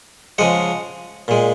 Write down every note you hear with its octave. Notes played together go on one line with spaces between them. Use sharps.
C#3 F3 G#3 D#5 F#5
A#2 G#3